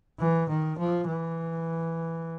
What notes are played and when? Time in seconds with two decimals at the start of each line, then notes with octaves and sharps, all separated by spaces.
0.19 E3
0.49 D#3
0.78 F3
1.08 E3